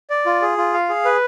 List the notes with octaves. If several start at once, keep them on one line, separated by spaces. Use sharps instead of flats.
D5
F4
G#4
F4
F5
G#4
B4